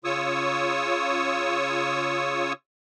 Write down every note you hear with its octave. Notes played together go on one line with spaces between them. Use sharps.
C#3 F4 C#5 C#6 D#6 E6